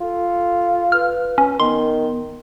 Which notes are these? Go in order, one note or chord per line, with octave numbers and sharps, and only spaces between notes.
F4 A4
B4 F6
C#4 B4
D#3 B3 C6